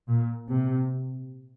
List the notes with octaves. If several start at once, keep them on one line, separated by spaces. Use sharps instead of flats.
A#2
C3